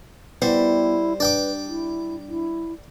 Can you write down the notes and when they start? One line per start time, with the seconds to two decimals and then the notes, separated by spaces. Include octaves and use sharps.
0.42 G3 B3 E4 C5
1.20 D4 B4 D5 G5 D6
1.68 E4
2.29 E4